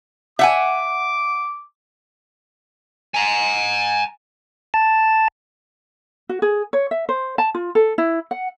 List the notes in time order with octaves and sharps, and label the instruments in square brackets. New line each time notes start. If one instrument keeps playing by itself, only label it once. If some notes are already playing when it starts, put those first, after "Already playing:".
[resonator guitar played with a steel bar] E5 F#5 G#5 [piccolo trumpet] D6
[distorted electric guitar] G#5 A#5
[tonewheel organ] A5
[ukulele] F#4
G#4
C#5
E5
C5
A5
F4
A4
E4
F#5